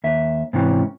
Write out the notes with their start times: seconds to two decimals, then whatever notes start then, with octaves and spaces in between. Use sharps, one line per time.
0.04 D#2 E5
0.53 G#2 C3 E3 C#4